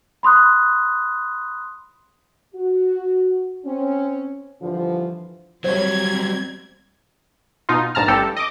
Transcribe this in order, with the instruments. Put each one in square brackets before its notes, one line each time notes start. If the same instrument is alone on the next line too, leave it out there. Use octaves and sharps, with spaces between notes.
[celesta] B5 C6 D#6 F#6
[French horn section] F#4
C4 C#4
G2 D3 E3 F3
[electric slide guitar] F#3 G3 [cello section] C4 [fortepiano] C5 C#5 [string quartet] G#6
[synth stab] B2 D#4 F4
A#1 G#2 A5 A#5 F6
A1 G2 G4 A4
D#5 D6